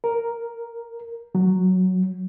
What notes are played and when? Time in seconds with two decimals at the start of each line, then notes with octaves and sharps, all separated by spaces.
0.04 A#4
1.35 F#3